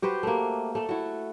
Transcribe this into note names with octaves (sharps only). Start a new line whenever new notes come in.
F#4 G4 B4 C5
A3 A#3
A3 A4
E4 F#4